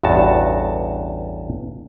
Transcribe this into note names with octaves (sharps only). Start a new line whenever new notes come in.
A1 E2 G2 F#4 A5